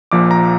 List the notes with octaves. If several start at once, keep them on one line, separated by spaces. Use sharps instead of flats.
A#1 A#2 F3 D6
A#5